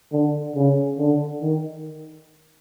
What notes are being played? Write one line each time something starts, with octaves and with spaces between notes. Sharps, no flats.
D3
C#3
D3
D#3